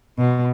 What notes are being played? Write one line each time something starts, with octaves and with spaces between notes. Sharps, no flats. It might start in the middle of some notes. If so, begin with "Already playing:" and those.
B2